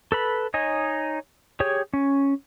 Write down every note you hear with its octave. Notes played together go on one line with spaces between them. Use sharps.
A4 B4 B5
D#4 C#5 D#5 G#5
G4 G#4 C#5
C#4